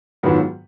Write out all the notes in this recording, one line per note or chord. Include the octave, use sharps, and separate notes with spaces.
G#2 D#3 F#3 B3 F4